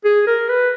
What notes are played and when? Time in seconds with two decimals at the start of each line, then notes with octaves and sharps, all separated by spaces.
0.05 G#4
0.27 A#4
0.49 B4